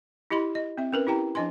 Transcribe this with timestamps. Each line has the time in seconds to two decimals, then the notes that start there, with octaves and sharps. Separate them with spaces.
0.30 E4 G4 D#5 B5 C6
0.55 D#5
0.78 C4 E5
0.93 C#4 A#4 B4
1.07 E4 G4 G5 A#5
1.35 F3 D4 D#5 G#5 C6